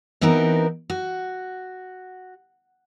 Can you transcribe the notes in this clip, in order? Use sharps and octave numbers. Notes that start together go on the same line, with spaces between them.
E3 B3 C4 D#4 F#4 A#4
F#4